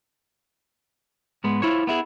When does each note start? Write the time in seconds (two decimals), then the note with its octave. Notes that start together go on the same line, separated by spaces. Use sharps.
1.44 G#2 G#3 B3
1.62 E4 F4 C5 C#5
1.87 B3 E4 G#4